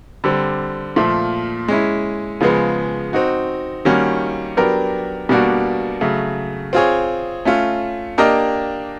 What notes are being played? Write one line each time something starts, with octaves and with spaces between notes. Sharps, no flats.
D3 G3 C4
A#2 F3 A3
G#3 C#4 E4
C#3 F3 G#3 B3
C4 D#4 F#4
D#3 G3 A#3 C#4 F#4
F#3 B3 D4 G4 A#4
B2 G3 A#3 D4 F#4
C#3 F#3 A3
C4 F4 G#4 C#5
A3 C#4 F4
A#3 D4 G4 A#4 D#5